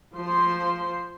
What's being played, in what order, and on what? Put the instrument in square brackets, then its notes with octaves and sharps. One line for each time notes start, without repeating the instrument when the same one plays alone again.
[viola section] F3 C5 C6